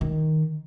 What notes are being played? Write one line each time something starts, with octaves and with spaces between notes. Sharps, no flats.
D#3